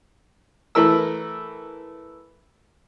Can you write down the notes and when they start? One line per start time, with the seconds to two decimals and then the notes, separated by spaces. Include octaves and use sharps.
0.75 E3 A3 E4 A#4 E6